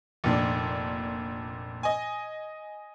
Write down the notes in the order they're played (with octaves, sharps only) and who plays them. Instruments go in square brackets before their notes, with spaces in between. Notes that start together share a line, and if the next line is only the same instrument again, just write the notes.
[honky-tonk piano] F1 A#2 D4
D#5 G#5